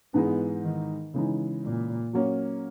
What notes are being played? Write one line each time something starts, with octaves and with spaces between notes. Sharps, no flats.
G#2 E3 G#3 B3 D#4
D#3
C#3 E3 G#3 D#4
A#2
F#3 A#3 C#4